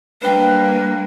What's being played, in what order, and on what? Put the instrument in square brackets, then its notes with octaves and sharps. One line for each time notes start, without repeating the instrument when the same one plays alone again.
[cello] G3 A#3 [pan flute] D4 [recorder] B4 [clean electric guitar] C5 G5